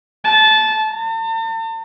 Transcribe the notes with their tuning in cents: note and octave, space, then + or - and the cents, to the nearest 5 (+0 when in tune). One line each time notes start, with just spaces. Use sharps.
A5 -20
A5 +45